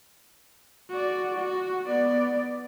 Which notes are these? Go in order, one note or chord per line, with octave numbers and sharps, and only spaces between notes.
F#4 D5
F#4
B3 D5